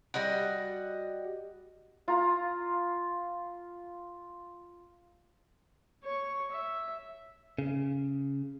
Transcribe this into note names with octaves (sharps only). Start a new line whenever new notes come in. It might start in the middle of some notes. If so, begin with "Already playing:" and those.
G3 F#4 D#5 F#5
F4 A#5
C#5 C#6
E5
C#3